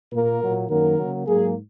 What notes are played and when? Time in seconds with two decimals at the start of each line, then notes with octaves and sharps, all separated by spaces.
0.12 A#2 A#3 A#4
0.41 A#2 F#3 A#3
0.69 F#2 D#3 F#3 A#3 A#4
0.98 C#3 F#3 A#3
1.27 G#2 F#3 A#3 G#4